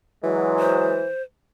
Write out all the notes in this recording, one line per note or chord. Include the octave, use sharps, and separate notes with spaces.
E3 F#3 G#3
C5